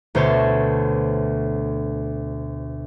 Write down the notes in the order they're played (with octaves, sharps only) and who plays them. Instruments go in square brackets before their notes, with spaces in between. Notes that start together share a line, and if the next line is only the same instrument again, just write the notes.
[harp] D2 B2 C5 C#5 A5